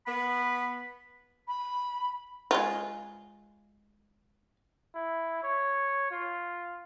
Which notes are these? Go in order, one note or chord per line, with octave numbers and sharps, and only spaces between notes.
B3 B5
B5
G#3 F4
E4
C#5
F4